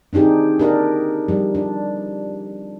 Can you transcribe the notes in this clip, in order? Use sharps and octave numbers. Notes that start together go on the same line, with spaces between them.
C4 D4 D#4 G4 G#4
D4 G4 A#4 D5 D#5
F3 G3
D4